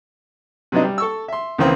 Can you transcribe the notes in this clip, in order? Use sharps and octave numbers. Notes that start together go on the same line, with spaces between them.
C3 F#3 B3 D4 D#4
G3
A4 C#6 E6
E5 C6
C#2 D#3 E3 A#3 C4